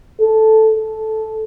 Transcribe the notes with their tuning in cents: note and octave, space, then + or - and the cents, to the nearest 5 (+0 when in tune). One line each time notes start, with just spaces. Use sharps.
A4 -5
A4 -10